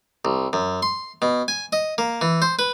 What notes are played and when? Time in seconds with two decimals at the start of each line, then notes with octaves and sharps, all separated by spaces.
0.25 C2
0.53 F#2
0.82 C6
1.22 B2
1.48 G#5
1.73 D#5
1.98 A#3
2.21 E3
2.42 C5
2.59 B4